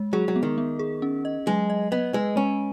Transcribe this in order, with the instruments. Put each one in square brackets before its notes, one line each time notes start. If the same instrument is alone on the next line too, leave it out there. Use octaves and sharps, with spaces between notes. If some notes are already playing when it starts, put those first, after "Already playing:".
Already playing: [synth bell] G#3
[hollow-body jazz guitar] F#3 [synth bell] G#4
[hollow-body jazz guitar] F#3
[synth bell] B3
[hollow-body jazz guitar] D#3
[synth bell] B3
G#4
C#4
D#5
[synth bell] F#3 [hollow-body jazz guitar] G#3
[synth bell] D#5
[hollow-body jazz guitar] B3 [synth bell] D#5
[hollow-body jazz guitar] G#3 [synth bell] B4
[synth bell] G#3 [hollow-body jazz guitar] C#4